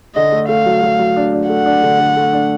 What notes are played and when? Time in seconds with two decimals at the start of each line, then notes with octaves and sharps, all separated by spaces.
0.15 D3 D#5
0.32 A3
0.49 A3 F5
0.66 F#3
0.83 F#3
0.99 F#3
1.16 D4
1.33 D4
1.49 A3 F#5
1.66 D4
1.83 D3
1.99 D3
2.16 A3
2.33 D4